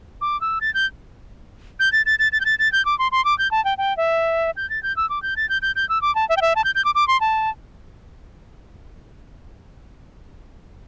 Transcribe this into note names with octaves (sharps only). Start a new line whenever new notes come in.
D6
E6
A6
G6
G6
A6
A6
A6
A6
G6
A6
A6
G6
D6
C6
C6
D6
G6
A5
G5
G5
E5
G6
A6
G6
E6
D6
G6
A6
G6
G6
G6
E6
D6
A5
E5
G5
E5
A5
G6
G6
D6
D6
C6
A5